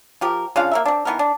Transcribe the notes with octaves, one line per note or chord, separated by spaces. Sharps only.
F3 G4 A#4
C#3 D4 F4 F5
A#3 A#4 E5
C4 D4
E3 B3 D#4 A#4
D4